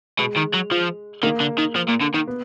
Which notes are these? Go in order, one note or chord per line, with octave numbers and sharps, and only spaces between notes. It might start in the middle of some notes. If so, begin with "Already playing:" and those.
B2 G#3
D#3
F#3
F3
D#3 A#3
D3
D#3
F3
A#2
D3
D#3
B3